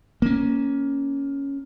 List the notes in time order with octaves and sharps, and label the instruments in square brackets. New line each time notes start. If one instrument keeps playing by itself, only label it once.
[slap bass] A#3 C#4